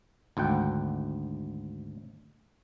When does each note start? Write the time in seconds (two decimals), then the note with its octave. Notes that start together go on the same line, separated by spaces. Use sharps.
0.37 G#1 D2 F#5 G5